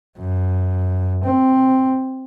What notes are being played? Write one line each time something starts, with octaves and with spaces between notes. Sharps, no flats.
F#2
C4